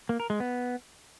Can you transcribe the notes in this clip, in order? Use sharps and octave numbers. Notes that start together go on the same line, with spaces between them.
A#3
A#4
G#3
B3